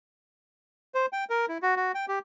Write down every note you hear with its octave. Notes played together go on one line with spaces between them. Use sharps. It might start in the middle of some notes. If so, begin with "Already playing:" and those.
C5
G5
A#4
E4
F#4
F#4
G5
G4